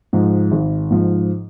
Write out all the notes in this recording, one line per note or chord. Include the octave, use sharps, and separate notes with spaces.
G#2 F3
G#1
G#2 F3